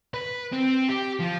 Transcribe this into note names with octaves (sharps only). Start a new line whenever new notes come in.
B4
C4
G4
F3 F4